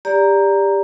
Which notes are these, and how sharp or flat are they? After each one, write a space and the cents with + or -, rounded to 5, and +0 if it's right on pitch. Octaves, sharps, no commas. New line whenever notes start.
G4 +20 D5 -15 A#5 +0